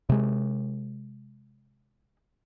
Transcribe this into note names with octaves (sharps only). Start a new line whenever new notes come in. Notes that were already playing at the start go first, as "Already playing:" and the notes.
C3 G#3